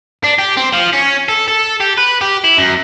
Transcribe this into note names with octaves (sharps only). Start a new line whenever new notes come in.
D4
G4
C4
F3
C#4
A4
A4
G4
B4
G4
E4
F#2